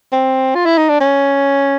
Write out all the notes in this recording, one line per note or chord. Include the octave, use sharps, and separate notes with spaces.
C4
F4
E4
D#4
D4
C#4